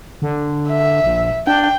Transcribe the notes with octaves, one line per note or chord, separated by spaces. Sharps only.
D3
E5
A#1
D4 G5